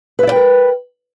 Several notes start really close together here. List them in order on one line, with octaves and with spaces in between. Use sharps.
B4 E5 D5 G5 A#4